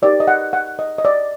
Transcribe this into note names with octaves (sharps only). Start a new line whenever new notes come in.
D#4 G4 A#4 D5
D#5
F#5
F#5
D#5
D#5
D5